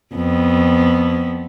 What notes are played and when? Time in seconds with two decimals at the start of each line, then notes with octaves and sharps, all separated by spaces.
0.15 F2 B3